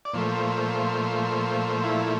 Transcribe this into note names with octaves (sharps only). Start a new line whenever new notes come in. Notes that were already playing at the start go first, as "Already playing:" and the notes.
D5
A#2 F3 A3 C5
E4